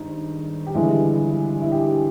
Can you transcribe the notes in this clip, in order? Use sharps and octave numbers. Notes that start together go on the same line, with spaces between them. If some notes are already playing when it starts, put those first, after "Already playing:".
Already playing: G#1 G2 D#4
G4
G1 G2 E3 G#3 E4
E4
G4